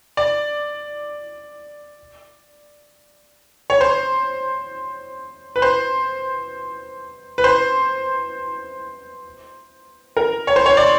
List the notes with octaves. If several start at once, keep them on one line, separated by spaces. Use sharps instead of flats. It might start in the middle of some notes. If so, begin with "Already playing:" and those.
D5
C#5
C5
B4
C5
B4
C5
A#4
C#5
C5
C#5
D5